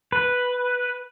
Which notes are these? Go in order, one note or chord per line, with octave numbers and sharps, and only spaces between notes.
B4